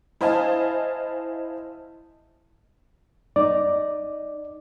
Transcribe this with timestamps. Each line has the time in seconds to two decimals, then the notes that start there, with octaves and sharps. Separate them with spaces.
0.21 E4 C5 D#5 F5 G#5 A5
3.36 D#4 D5